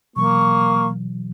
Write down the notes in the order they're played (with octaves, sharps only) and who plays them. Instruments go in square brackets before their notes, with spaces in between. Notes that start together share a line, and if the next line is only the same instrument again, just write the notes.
[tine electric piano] B2 E3 F#3 [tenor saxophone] A#3 [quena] C#6